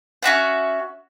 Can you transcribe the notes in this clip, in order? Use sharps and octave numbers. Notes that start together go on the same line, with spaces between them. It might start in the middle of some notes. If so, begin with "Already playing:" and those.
C#4 F#4 E5 F#5